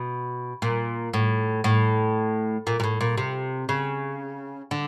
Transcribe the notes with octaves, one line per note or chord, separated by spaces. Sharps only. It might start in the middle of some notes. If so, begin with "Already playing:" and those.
Already playing: B2
A#2
A2
A2
A#2
A#2
A2
A#2
C3
C#3
D3